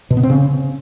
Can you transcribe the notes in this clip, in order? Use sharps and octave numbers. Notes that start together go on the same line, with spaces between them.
B2
B3
C4
C#3